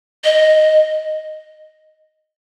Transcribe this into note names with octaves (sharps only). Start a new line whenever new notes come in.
D#5